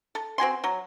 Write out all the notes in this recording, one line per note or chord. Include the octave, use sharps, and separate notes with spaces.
A4
C4 F#4 G#5 C6
F#3